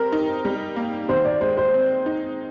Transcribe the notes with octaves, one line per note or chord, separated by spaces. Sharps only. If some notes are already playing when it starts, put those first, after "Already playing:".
Already playing: G3 C4 A#4
D#4
G3
A#3
D#3 C5
D5
G#3 C5
C5
C4
D#4